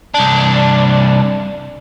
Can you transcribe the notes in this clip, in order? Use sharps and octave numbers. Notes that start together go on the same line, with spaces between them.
C2 D4